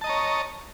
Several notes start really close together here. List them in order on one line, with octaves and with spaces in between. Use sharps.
A5 D#5 A#5 C#5